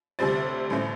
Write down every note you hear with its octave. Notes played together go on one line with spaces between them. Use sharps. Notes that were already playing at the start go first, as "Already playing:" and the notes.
D2 C3 G3 C4 A6
A1 A2 A3 C4